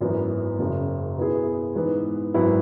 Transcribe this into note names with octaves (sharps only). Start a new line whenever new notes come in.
G#1 F#2 E3 B3
F#1 F#2 C#3
B2 B3 E4 G#4
G#2 E3 B3
G#1 F#2 F#3 B3 E4